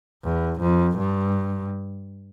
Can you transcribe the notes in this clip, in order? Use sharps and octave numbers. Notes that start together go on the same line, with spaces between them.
E2
F2
G2